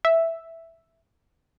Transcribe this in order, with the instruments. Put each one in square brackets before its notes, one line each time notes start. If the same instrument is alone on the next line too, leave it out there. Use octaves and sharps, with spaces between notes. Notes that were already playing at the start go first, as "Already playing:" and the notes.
[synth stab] E5